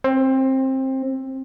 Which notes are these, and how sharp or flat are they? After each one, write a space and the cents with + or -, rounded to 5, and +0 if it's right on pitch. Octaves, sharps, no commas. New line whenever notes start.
C4 +20